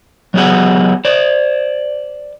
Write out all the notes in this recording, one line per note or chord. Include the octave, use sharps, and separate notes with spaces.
F#3 B3 G4 G#4 F#5
C5 D5